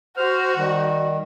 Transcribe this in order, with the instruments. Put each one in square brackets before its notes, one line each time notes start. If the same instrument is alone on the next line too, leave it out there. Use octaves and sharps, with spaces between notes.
[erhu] F#4 [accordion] C5 [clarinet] F6
[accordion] D#3 [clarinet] G3